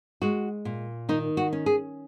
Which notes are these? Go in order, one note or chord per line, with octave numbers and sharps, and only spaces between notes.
G#3 F#4
A#2
D#3 D#4
F#4
C#4
G#4